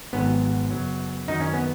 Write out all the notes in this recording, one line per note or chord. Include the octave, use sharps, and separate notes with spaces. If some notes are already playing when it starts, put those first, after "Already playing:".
G#1 G#2 F#3 B3
F#2 C#3 F#3
F#2 D#3 F#3 D#4
C#4
B3